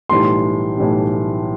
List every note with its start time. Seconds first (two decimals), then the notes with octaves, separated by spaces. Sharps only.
0.09 B1 A2 E3 G3 C6
0.77 B1 A2 E3 G3